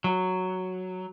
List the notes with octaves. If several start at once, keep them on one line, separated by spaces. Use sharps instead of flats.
F#3